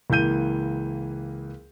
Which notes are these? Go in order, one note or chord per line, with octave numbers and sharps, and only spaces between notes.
C#2 E3 A#3 G6 D#7